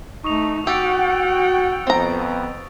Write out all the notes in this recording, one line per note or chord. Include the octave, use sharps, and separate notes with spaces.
A3 D#4 C#6 D#6 F7
F#4 G4 F#5 G5 E6 A6 D7
F2 B3 C4 A#5